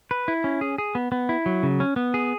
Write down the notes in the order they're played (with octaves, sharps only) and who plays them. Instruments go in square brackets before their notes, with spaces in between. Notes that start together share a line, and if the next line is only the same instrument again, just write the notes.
[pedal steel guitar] B4
E4
C#4
G#4
G#4
B3
B3
E4
F#3
C#3
C#4
B3
G#4